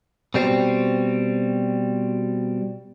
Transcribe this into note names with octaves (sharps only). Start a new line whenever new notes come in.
B2 G3 C4